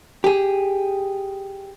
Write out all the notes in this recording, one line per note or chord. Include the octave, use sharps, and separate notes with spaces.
G4 G#4